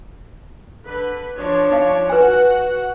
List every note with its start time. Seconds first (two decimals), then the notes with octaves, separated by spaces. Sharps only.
0.87 D3 B4
1.38 F3 D4 C#5
1.72 D#4 F5
2.10 F#4 B4 F#5 G#5